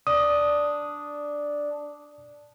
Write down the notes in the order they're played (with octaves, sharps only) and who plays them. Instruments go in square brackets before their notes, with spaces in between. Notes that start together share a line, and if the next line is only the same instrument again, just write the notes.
[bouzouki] D4 [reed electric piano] D#6